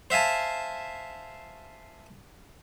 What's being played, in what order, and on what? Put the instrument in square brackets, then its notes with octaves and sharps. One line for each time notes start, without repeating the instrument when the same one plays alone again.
[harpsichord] C5 E5 F5 G#5 A5